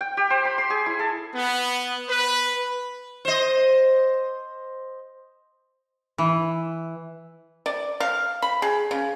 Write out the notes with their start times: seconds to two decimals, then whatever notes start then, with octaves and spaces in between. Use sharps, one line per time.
0.01 G5
0.17 G4
0.30 C5
0.45 B5
0.58 C6
0.70 G#4
0.86 E4
0.99 A4
1.35 B3
2.09 B4
3.25 C5 D#5
6.18 E3
7.66 D5
8.00 F5
8.42 B5
8.62 G#4
8.91 C#3